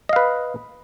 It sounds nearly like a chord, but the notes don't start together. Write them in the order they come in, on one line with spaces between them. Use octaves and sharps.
D#5 F5 B4